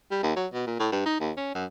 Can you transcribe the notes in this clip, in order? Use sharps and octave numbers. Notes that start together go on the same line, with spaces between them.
G3
D#2
F#3
B2
A#2
A2
G2
D#4
D#2
C#4
F#2